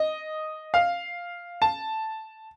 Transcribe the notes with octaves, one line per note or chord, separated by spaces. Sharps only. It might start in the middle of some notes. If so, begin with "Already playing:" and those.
Already playing: D#5
F5
A5